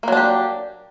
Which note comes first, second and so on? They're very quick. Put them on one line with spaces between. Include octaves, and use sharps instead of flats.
A#3 F#3 D4 G4